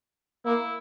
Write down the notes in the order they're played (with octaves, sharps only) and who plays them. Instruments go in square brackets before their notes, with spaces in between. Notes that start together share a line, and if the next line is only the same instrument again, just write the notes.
[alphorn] A#3 [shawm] E4